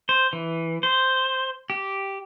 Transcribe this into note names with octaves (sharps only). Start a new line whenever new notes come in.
C5
E3
C5
G4